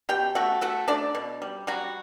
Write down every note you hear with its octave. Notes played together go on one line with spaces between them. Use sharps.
B2 G4 G5
A3 F#4 F#5
A3 F#4 F#5
A3 D4 D5
B2
G3
F#3 G3 F#4